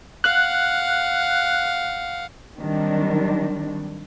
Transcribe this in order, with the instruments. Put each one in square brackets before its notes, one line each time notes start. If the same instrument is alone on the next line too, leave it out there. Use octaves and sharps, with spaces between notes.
[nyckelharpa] F5 F#5 [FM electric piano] F#6
[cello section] D#3 F#3 G3 C4 D4